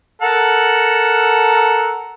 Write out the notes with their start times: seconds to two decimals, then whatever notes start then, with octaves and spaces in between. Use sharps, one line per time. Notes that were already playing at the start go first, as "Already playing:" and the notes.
0.22 A4 A#4 F#5